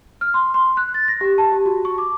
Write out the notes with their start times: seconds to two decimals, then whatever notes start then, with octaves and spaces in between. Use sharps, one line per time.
0.21 F6
0.34 C6
0.54 C6
0.77 F#6
0.94 A6
1.08 A#6
1.21 G4
1.38 A5
1.52 G4
1.66 F#4
1.85 C#6
1.98 D6